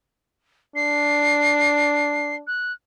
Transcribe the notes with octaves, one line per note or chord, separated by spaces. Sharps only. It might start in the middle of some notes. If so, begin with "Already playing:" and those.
D4 C7
F#6